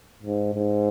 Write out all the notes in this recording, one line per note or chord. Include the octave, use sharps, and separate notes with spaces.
G#2
G#2